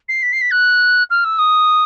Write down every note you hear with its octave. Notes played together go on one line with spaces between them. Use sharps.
C7
B6
C7
B6
F#6
F6
E6
D#6